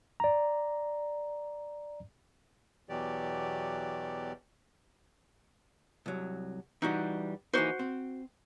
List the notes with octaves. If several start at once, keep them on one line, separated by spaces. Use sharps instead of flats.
D5 A#5
E2 B2 E3 F#3 G4 D5
C2 F#3
E3 G3 D#4 F#4
E3 A#3 D#4 F#4 C5
C4